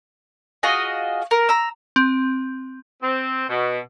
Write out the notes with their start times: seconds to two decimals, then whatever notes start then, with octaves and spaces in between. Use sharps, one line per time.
0.63 F4 F#4 G#4 D#5
1.31 A#4
1.49 A#5 E6
1.96 C4
3.02 C4
3.49 B2